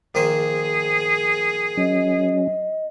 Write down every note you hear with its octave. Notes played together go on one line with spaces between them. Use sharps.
A#1 D#3 G#4 C5
F#3 C#4 D#5